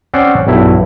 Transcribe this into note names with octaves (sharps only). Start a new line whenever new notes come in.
C4 C#4 C5 D5 F#5
B1 G2 E4